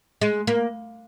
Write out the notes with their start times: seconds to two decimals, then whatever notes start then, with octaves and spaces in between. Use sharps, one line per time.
0.21 G#3
0.47 A#3